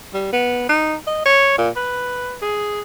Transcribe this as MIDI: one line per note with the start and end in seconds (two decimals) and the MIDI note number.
0.14 0.31 55
0.33 0.68 59
0.69 0.95 63
1.07 1.22 75
1.26 1.53 73
1.58 1.69 46
1.76 2.36 71
2.42 2.81 68